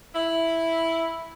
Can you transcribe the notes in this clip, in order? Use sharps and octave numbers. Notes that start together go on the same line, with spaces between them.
E4